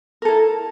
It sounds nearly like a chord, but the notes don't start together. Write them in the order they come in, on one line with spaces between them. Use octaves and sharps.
A#4 A4 E4